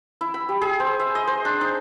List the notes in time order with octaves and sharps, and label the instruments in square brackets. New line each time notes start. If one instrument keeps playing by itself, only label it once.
[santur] E4
B5
G4
G#4
C5
E5
D#5
C5
D4
D#4